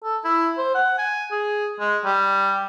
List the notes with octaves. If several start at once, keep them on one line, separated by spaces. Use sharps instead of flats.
A4
E4
C5
F#5
G#5
G#4
G#3
G3